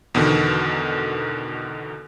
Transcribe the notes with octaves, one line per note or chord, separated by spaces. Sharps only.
E2 B2 D3 D#3